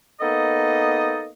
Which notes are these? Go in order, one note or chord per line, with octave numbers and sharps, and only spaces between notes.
A#3 B3 D#4 A4 D#5